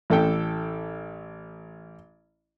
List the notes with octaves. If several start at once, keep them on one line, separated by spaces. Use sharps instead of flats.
A1 A4 G5